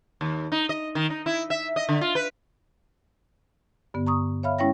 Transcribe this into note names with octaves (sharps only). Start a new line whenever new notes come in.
D#2
D#4
D#5
D#3
D#4
E4
E5
D#5
D3
F4
B4
G2 D3 B3
A#5 C#6 D#6
C#5 E5 F5 B5 F6
G#3 C#4 E4 C#5 G5 A#6